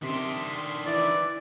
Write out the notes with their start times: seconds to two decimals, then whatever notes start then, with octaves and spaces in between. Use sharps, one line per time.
0.02 C3 D#3 D4 C6 B6
0.86 E3 E4 D5